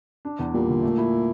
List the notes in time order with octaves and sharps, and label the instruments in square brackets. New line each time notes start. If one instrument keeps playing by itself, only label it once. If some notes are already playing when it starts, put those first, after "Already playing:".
[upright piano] D4
E2
[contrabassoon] A#2 [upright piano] G3
[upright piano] D3
A3
E4